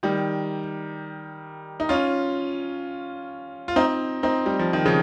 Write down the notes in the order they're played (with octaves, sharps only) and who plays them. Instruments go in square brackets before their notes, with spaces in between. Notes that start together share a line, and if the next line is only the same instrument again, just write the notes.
[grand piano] D#3 G3
D#4
C#4 F4
F4
C4 D#4
C4 D#4
G3
F3
D#3
C#3 F3